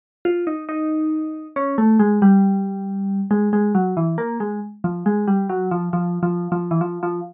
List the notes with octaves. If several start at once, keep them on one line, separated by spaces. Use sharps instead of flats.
F4
D#4
D#4
C#4
A3
G#3
G3
G#3
G#3
F#3
E3
A#3
G#3
F3
G#3
G3
F#3
F3
F3
F3
F3
E3
F3
F3